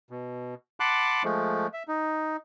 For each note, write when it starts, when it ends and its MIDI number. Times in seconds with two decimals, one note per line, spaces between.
0.10 0.55 47
0.80 1.23 78
0.80 1.23 81
0.80 1.23 83
0.80 1.23 84
0.80 1.23 86
0.80 1.23 90
1.24 1.67 53
1.24 1.67 56
1.24 1.67 57
1.73 1.83 76
1.88 2.37 63